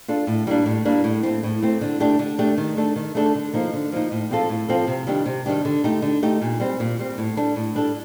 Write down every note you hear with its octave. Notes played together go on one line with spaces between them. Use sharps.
D4 F4 A4
A2
G3 A#3 D4
A2
G3 A#3 D4
A2
A3 C4
A2
A3 C4
D3
A3 D4 G4
D3
A3 D4 G4
D#3
A3 D4 A4
D#3
A3 D4 A4
D3
F3 A#3 D#4
D3
F3 A#3 D#4
A2
F3 C4 F4 A4
A2
F3 C4 F4 A4
C3
D#3 G3 D4 G4
C3
D#3 G3 D4 G4
D3
A3 D#4 G4
D3
A3 D#4 G4
A#2
G3 C4
A#2
G3 C4
A2
G3 D4 A4
A2
G3 D4 A4